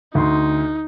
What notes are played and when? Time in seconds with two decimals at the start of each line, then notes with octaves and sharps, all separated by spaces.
0.15 D2 D#4 C6